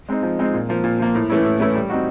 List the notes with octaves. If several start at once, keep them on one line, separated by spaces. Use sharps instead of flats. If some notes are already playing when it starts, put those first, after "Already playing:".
G#3 C4 D#4
F3
G#3 C4 D#4
A#2
F3 A#3
A#2
F3 A#3
A2
E3 A3 C#4 E4
A2
E3 A3 C#4 E4
G3
C4 D#4 F#4